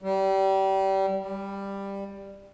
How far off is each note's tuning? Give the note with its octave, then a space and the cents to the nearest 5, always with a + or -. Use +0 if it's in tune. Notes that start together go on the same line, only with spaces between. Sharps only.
G3 -25
G3 +10